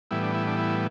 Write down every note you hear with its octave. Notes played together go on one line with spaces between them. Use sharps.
A2 E3 G3 B3 E4
D4
E4
D4
E4